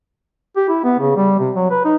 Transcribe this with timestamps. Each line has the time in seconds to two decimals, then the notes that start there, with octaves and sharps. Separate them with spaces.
0.56 G4
0.69 E4
0.84 B3
0.99 C#3
1.16 G3
1.39 C3
1.55 F#3
1.70 B4
1.85 D#4